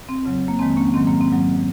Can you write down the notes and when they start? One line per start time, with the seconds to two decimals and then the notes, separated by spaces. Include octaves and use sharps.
0.09 C4
0.25 F2 C#3 F#3
0.48 A#3
0.59 F2 D#3 G#3 C4
0.76 A#3 C#4
0.94 G#2 D#3 F#3 C4
1.07 A#3
1.21 C4
1.27 G#2
1.32 F#3